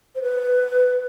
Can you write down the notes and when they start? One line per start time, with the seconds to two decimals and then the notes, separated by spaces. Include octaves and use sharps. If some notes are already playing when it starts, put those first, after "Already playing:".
0.15 C5
0.22 B4